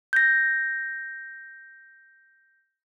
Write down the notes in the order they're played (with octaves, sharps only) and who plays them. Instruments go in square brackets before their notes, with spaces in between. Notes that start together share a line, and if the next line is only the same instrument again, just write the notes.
[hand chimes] G6 A#6